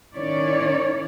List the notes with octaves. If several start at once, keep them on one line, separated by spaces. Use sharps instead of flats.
D#3 C#4 E4 C#5 D5